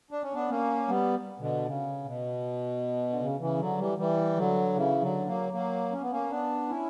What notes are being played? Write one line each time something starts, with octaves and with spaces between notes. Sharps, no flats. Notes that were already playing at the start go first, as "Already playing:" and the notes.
D4
C#4
B3 D4
A#3 C#4
G3 B3
B2 D3
C#3
B2
D3
C#3
C#3 E3
D3 F#3
E3 G3
E3 G3
D3 F#3
C#3 E3
D3 F#3
F#3 A#3
F#3 A#3
C#4
B3
A#3 C#4
B3 D4
C#4 E4